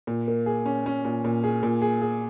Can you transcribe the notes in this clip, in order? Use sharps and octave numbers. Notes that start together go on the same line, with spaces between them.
A#2
A#3
G#4
C#4
C#4
A#2
A#2
G#4
A#2
G#4
G#4